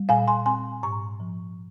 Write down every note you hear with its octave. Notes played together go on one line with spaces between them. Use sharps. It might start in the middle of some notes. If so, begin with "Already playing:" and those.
Already playing: G3
A#2 F5 G#5
G#5 C6
C4 G#5 C6
G#2 A#5 C#6
F3